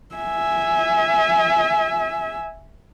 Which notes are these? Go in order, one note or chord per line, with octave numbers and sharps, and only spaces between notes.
E5 G#5